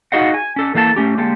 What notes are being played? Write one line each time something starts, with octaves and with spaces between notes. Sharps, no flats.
D#4 F#4 G#4 D#5 F5 F#5
G#5
C#4 A4
E3 A#3 A4 F5 A5
A3 C#4 G4
D3 G#3 A#3 G4 A4